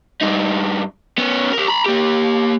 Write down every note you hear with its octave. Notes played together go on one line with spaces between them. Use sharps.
G2 D#4
B3 C#4
G4 A#4
A#5 B5
A#3 G4